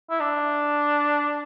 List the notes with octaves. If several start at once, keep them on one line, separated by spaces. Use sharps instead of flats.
E4
D4